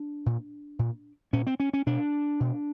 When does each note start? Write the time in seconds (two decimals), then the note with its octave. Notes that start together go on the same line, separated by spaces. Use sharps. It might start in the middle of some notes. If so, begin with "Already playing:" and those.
Already playing: D4
0.26 A#2
0.79 A#2
1.33 A#2 C#4
1.47 C4
1.60 C#4
1.73 C#4
1.86 B2 D4
2.40 B2